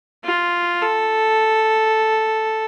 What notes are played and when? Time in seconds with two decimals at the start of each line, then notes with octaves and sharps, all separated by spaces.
0.24 F4
0.82 A4